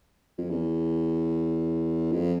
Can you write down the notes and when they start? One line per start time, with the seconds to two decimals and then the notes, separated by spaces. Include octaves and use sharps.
0.38 F2
0.50 E2
2.12 F2